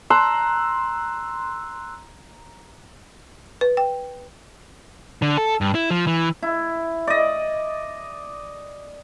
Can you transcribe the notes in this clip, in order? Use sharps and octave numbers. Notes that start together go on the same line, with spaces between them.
A#5 C6 E6 F#6
B4
G5
D3
A4
G2
E4
F3
E3
E4
D5 D#5